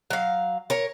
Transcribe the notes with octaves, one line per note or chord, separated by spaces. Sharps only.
F#3 F5
A#4 C#5